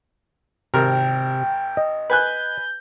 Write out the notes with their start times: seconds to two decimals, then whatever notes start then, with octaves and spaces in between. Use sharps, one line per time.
0.74 G#1 C3 A#4 G5
1.77 D#5
2.10 B4 G#5 F#6 G6